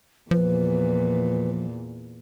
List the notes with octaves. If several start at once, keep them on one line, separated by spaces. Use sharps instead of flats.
E2 A#2 F3 B4